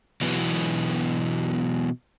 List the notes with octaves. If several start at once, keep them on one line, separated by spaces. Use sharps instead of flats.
B2 E3 F#3 B3